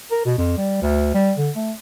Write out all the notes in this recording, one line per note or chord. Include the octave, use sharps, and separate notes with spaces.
A#4
B2
F2
G3
D2
G3
D3
A3